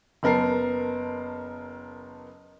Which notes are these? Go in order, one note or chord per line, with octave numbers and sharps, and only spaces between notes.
F#1 B3 A#4 A5 C7